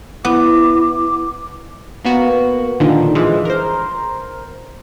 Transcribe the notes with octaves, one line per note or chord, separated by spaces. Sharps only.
B3 E4 D6
A#3 B3 F#4
A#2 D3 D#3 F3
E3 F3 G#3
A#4 C5